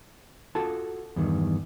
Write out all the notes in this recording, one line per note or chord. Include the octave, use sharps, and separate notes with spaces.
F4 F#4 A4 A5
E2 G2 D#3